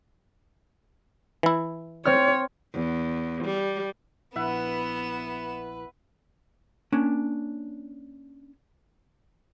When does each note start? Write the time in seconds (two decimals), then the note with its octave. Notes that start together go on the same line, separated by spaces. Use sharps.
1.43 E3 E4
2.05 C4 C#5 F6
2.73 E2
3.44 G3
4.36 A#1 B3 E4 B4 E5 F#5 F#6 E7
6.92 A#3 C#4 D4